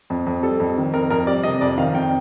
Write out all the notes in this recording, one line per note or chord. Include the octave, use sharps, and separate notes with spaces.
F2
F2
G3 A4
F2
D#3
F2 A#4
F2 A#4
G3 D5
C3 D#5
F2 D5
D#3 F5
F2 G5